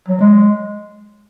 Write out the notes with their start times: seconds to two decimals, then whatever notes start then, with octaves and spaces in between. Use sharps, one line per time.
0.08 F#3
0.20 G#3